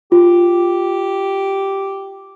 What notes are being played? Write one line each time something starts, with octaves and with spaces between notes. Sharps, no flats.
F4 G4